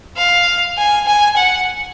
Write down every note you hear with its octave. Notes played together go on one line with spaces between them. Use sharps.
F5
G#5
G#5
F#5